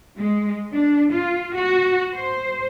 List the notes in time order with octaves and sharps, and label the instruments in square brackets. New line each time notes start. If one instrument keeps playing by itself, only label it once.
[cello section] G#3
D4
F4
F#4
C5